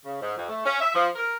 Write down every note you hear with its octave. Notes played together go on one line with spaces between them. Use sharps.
C#3
G#2
F2
A3
C#4
E5
F3
A#4